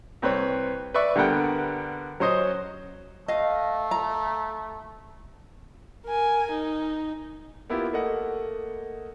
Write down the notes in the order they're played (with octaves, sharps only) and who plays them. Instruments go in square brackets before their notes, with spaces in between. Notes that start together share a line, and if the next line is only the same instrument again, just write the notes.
[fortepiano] C2 C4 B4 C#5
B4 D5 E5 C#6
D3 G3 B3 A#4 F#5 G5
F#3 C#4 C5 D#5
[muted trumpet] A3 [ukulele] D#5 F5
[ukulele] A#5
[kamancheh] A#4 G#5
D#4
[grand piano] A#3 B3 E4 F4 G4
A3 A#3 D#5 F#5